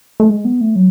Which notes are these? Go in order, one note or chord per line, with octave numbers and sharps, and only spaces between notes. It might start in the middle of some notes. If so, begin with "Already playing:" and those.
A3
G#3
B3
A3
F#3